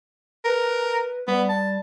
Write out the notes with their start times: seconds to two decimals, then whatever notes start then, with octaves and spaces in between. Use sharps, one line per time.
0.45 A#4 B4
1.28 G3 B3
1.49 A5